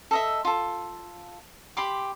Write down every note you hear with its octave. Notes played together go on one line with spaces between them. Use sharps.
A4 D#5 E5
F4 A4
G4 B5 C6 D6